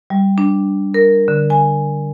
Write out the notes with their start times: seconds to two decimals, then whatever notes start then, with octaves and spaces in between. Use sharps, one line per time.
0.10 G3
0.38 D4
0.94 A#4
1.28 D3
1.50 G#5